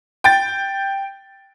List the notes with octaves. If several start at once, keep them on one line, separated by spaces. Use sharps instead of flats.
G5 A6